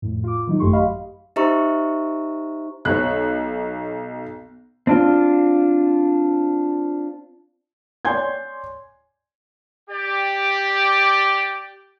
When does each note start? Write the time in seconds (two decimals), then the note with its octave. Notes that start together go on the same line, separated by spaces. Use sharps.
0.02 F2 A2
0.24 F4 D6
0.47 D#3 F#3 D#4
0.60 A1 F#2 A3 G4 C6 C#6
0.73 G4 D#5 F5 B5
1.36 D#4 G4 C5 E5 A#5 C#6
2.85 B1 C#5 F#6
4.87 C4 D4 F4
8.05 C#5 D5 G#5 C6 G6 G#6
9.90 G4 D5